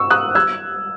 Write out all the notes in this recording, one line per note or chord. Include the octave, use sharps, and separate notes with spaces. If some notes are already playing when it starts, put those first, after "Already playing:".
Already playing: C#6 E6
D#6 F#6
E6 G#6